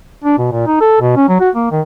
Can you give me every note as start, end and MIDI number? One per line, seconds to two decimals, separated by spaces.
0.24 0.38 62
0.38 0.47 47
0.52 0.65 46
0.67 0.79 63
0.81 1.00 69
1.01 1.15 47
1.16 1.24 61
1.28 1.36 54
1.40 1.50 66
1.55 1.66 58
1.71 1.81 51